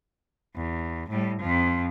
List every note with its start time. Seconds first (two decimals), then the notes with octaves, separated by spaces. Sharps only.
0.56 E2
1.10 A2 G3
1.41 F2 F3